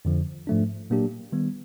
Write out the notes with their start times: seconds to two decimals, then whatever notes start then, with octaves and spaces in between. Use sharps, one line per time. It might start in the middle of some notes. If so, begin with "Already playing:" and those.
0.05 F2 D3 F3
0.47 G#2 F3 A3 D4
0.90 A#2 F#3 A#3 D4 G4
1.32 D#3 G3 B3